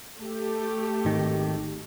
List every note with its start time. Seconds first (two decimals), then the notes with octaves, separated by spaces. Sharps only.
0.20 A3 G4
1.05 G#1 D#3